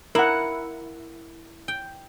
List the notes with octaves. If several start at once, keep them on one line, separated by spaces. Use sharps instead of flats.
E4 A#4 F#5
G5